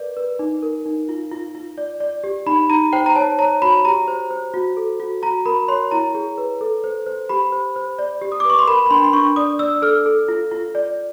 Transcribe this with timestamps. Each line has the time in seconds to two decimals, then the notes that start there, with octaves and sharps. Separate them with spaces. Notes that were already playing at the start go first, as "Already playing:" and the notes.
Already playing: A#4 B4 D5
0.17 B4
0.39 D#4
0.63 A#4
0.86 D#4
1.09 F4
1.31 F4
1.55 F4
1.78 D5
2.00 D5
2.24 G4
2.46 D#4 B5
2.70 D#4 A#5
2.93 C5 G5
3.06 A#5
3.16 C#5 A5
3.39 C#5 A#5
3.62 F#4 B5
3.85 G4 A#5
4.08 C5
4.31 C5
4.54 F#4
4.77 A4
5.00 F#4
5.23 F#4 A#5
5.46 A#4 B5
5.68 C#5 C6
5.91 E4 A#5
6.15 G#4
6.38 B4
6.61 A4
6.84 C5
7.07 C5
7.29 G4 B5
7.52 C5
7.76 C5
7.99 D5
8.21 G4
8.32 D#6
8.40 D6
8.45 B4
8.50 C#6
8.59 C6
8.67 A#4 B5
8.86 B5
8.90 D4 C6
9.04 C6
9.13 D4 C#6
9.36 D5 D#6
9.59 D5 E6
9.82 A4 F6
10.06 A4
10.28 F4
10.51 F4
10.75 D5